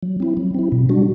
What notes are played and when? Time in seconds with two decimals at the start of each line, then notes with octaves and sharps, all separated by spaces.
0.03 F#3
0.20 C4 E4
0.37 F#3
0.55 C4 E4
0.72 B2
0.89 G3 D4 F#4